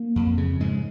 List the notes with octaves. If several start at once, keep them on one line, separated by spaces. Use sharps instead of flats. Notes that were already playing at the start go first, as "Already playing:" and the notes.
Already playing: A#3
F2
C#3
G#2 G#3